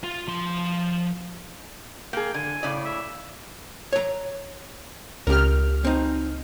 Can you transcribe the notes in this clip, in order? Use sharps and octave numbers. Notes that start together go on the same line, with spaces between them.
F4
F3 C6
A#3 G#4 G5
D3 G#5
A2 C#3 D5
E5
C#5 A#5
C#2 G4 A#4 F6
C4 D#4